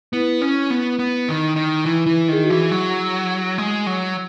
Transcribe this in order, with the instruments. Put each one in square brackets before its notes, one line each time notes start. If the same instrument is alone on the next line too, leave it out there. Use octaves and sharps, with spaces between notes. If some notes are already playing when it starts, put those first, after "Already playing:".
[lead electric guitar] B3 [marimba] E4
[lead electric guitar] C#4
B3
B3
D#3
D#3
[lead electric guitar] E3 [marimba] E4
[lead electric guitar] E3
[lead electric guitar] D#3 [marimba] G#4
[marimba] F#4
[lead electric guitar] E3
F#3
G#3
F#3